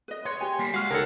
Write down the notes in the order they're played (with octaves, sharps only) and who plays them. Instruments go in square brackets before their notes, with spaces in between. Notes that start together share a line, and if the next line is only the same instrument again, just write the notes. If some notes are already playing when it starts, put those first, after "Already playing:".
[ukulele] B4 D#5
[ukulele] B4 [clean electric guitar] C#5 [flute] C6
[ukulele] G4 G#5
[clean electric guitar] G3 A#3
[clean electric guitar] G#3 F5 [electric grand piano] F#4 F6
[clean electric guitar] C#2 F#5 [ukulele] D4 D#4 C#5 [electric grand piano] A4 A#4 [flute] A5